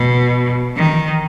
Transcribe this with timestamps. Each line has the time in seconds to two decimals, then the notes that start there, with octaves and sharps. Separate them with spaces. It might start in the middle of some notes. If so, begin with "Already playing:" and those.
Already playing: B2
0.76 D#3